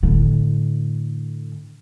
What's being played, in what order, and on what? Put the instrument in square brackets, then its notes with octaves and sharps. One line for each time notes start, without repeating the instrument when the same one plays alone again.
[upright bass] A2 D3